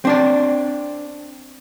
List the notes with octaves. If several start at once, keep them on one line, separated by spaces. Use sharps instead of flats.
C4 D4 D5